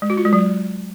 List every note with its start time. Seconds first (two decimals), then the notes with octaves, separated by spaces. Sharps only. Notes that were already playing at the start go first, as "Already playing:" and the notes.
0.02 G#3
0.10 F#4
0.17 F4
0.25 G#3
0.33 F#3